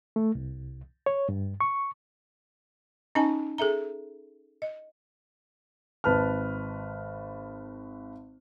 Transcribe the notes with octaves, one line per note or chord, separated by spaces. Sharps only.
A3
C2
C#5
G2
C#6
C#4 D#4 D#5 G#5 A5
G#4 A4 E5 A#5
D#5
G#1 B4 A5 F6